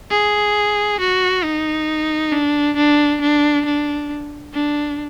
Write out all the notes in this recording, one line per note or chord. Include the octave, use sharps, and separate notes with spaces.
G#4
F#4
D#4
D4
D4
D4
D4
D4